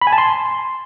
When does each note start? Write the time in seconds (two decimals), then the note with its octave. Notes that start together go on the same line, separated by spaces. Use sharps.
0.02 B5
0.07 G#5
0.13 A5
0.18 C6